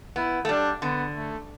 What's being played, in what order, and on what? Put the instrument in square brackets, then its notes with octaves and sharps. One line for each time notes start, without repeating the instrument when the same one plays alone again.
[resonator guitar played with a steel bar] B3 [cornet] E4
[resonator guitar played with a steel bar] A3
[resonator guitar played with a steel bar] G3 [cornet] D4
[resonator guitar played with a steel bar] D3 [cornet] B3
[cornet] A3